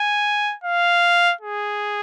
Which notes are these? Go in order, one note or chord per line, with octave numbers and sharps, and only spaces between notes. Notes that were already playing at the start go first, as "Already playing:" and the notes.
Already playing: G#5
F5
G#4